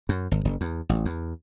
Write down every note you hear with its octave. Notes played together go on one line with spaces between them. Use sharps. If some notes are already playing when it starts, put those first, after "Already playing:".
F#2
G#1
F#1
E2
A1
E2